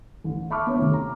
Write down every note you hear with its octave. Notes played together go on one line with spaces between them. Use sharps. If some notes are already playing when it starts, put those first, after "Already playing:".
A1
E5 A5 B5 C#6 D6 F6
B3 D4 C#5
D#2 C3 A3
A#5